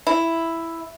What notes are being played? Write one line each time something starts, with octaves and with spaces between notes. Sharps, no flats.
E4